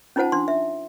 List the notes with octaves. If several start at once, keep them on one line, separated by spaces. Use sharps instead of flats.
C#4 D#4 F4 C5 F#5 A5
D4 C6
E5